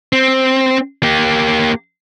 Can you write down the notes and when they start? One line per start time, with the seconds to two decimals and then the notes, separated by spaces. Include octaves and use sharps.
0.13 C4
1.03 A#3 G4